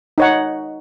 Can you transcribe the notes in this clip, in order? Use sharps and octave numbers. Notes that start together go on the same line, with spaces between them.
D#4 C#5 F#5